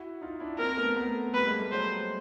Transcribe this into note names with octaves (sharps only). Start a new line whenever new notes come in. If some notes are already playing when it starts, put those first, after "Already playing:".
Already playing: E4 F#4
D#4 F4
D4 E4
A#3 C4 A#4
A3 B3
A3 B3
G3 A3 B4
G#3 A#3
G3 A3
F#3 G#3 C5